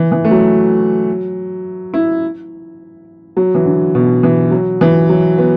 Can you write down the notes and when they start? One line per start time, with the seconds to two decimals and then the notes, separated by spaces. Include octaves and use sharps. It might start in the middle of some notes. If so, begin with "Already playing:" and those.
Already playing: E3
0.12 E3
0.25 A3
0.31 F#3
1.94 E4
3.37 F#3
3.55 E3
3.66 D3
3.95 B2
4.23 E3
4.51 F#3
4.81 E3
5.09 F#3
5.38 B3